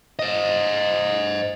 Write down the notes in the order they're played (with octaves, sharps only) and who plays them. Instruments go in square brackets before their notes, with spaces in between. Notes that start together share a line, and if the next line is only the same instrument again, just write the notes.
[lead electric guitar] C5 D#5